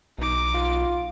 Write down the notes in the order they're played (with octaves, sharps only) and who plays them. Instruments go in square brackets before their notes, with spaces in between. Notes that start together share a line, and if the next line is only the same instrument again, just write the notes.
[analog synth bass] B1 [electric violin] D#4 D6
[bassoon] F4